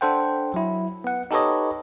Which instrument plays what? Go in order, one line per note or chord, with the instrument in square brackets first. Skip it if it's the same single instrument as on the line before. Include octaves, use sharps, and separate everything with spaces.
[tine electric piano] D4 A4 C5 F#5 G5
F#3 E4
B3 F#5
D#4 G4 A4 B4 C#5 D#5